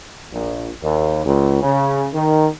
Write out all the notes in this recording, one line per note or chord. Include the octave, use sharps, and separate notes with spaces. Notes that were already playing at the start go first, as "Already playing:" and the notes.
A#1
D#2
C#2
C#3
D#3